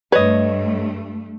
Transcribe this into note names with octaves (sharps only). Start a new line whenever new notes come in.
G2 A3 B4 C#5 D#5